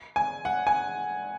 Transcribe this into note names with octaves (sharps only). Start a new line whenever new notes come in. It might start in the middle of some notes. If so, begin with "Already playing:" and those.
G#5
F#5
G#5